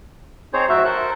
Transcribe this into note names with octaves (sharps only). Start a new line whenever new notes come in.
C4 D#4 G#4 C5 C#5
F2 G#2 C4 F#4 E5
A4 A#4 C5 F#6